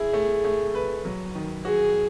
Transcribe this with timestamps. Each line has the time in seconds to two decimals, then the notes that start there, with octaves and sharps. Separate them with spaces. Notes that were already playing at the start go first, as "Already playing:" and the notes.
Already playing: E4 G#4
0.13 A3
0.44 A3
0.75 B4
1.05 F#3
1.35 D#3
1.65 F#4 G#4